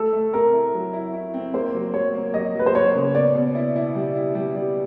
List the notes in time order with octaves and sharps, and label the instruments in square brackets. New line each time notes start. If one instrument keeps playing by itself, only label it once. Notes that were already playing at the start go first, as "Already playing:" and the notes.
Already playing: [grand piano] A3 [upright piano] A4
[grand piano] A3
[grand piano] C4 [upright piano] A#4
[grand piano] E4
F#3
E4
E4
C4
[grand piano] A#3 [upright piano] C5
[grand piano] F#3
[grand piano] F#3 [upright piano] C#5
[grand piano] A#3
[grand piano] F#3 [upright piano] D#5
[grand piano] F#3 [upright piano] B4
[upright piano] C5
[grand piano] A#3 [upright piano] C#5
[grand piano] C#3
[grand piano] B3 [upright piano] D5
[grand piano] B2
E4
E4
G3
E4
G3
G3